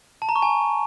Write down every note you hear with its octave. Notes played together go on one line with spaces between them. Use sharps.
A5
A#5
C#6
G#5